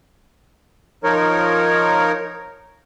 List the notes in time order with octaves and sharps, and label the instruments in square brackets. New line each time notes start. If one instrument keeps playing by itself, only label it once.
[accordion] F3 D#4 A#4 C#5